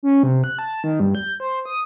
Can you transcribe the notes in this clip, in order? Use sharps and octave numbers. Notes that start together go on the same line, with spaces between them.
C#4
C3
F#6
A5
D#3
G2
G6
C5
D#6